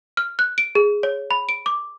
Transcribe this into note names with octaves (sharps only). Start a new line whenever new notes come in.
F6
F#6
D7
G#4
C#5
B5
D7
D6